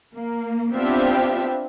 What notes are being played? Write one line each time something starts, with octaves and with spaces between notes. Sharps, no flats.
A#3
B3 C4 D4 F4 G4 E5